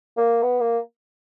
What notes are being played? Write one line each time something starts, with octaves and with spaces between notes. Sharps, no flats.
A#3
B3
A#3